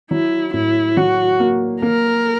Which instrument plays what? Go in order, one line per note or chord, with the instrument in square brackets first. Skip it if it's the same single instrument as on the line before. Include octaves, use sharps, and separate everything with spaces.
[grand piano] F#3 [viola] E4
[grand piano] A2 [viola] E4
[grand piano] F#3 [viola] F#4
[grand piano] A#3
[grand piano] A#3 [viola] A#4